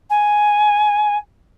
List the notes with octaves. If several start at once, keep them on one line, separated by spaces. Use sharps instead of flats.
G#5